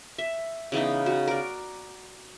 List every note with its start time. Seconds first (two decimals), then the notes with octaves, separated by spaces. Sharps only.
0.18 E5
0.72 C#3 E3 B3 D#4
1.06 F#4
1.28 A#4 D5